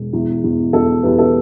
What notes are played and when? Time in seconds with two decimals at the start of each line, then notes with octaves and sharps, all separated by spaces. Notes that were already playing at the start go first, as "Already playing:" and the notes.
Already playing: E1
0.13 E2
0.44 E2
0.73 E2 A4
1.03 E2 G4 B4
1.18 A4